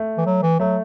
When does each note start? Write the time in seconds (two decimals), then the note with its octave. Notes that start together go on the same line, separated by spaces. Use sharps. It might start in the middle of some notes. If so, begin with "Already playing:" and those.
Already playing: A3
0.18 E3
0.26 F#3
0.43 E3
0.59 F#3 A3